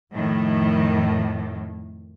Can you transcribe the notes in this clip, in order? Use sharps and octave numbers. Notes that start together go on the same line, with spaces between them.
F2 A2 D#3